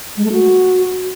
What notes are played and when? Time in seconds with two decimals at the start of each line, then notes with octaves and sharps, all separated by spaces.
0.17 G#3
0.25 A3
0.32 F#4